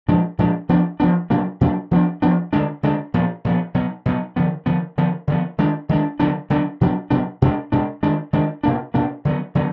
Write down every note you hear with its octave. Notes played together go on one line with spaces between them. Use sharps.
A#2 F3 G#3 D4
A#2 F3 G#3 D4
F3 B3 D4
F3 B3 D4
B2 F#3 A#3 D4
B2 F#3 A#3 D4
F3 B3 D4
F3 B3 D4
D3 G#3 D4
D3 G#3 D4
A#2 F3 B3
A#2 F3 B3
B2 F#3 B3
B2 F#3 B3
D3 F3 B3
D3 F3 B3
D3 F3 B3
D3 F3 B3
D#3 G#3 D4
D#3 G#3 D4
D3 F#3 B3 D4
D3 F#3 B3 D4
B2 F#3 B3 D4
B2 F#3 B3 D4
B2 G#3 D4
B2 G#3 D4
D#3 G#3 D4
D#3 G#3 D4
B2 A#3 D4
B2 A#3 D4
D3 F#3 B3
D3 F#3 B3